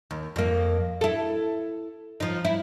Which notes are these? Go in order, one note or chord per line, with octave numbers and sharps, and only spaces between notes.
D#2
F2 A#3
E4 A4
F3 D#4
E4